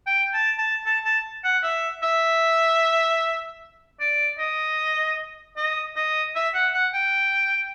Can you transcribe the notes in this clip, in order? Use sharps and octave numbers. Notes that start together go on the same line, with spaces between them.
G5
A5
A5
A5
A5
F#5
E5
E5
D5
D#5
D#5
D#5
E5
F#5
F#5
G5